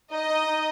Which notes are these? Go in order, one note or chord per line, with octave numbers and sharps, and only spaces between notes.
D#4 D#5
D#4
D#4